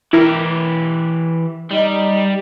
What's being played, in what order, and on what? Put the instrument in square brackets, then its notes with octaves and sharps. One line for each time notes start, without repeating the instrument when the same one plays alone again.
[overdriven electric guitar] E3 G4 [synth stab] E4 A#4
[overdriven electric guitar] G3 [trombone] D#4